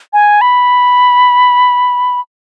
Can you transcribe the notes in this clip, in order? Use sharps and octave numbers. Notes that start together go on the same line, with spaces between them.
G#5
B5